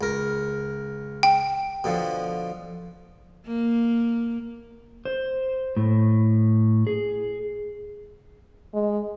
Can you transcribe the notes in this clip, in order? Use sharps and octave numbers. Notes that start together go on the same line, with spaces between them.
C#2 A#4
G5
B2 D3 F3
A#3
C5
A2
G#4
G#3